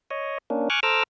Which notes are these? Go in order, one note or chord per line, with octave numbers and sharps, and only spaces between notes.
C#5 D#5
A#3 C#4 D4
G#5 C#6 D6 F6 F#6
A4 C5 A#5 D6 E6 F6